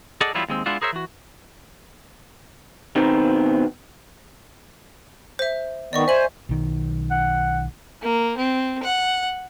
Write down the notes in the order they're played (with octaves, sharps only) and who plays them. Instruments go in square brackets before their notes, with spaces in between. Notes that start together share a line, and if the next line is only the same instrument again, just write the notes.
[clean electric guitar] G#4 A4 D5 D#5 F#5
E3 F#3 G3 B3 E4 F4
D#2 G#3 C4
G#3 B3 D4 E4 F4 F#5
G#4 A#4 C5 C#5 E5
E3 F#4
B2 D#3 B3 C4
[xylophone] C5 E5
[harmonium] D#3 B3 [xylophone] D5 D#5 C#6
[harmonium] C5 G#5 [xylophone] E5 F#7
[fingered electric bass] B1 D#3
[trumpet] F#5
[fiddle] A#3
C4
F#5